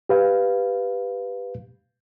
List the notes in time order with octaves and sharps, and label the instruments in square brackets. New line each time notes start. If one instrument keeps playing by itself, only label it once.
[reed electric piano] G4 B4 F5